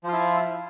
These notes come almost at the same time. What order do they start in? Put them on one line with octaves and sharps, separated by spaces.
F3 F4 E4